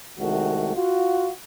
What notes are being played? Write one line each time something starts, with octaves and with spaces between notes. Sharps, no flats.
C2 D#3 G#3 A3 F#4
F4 F#4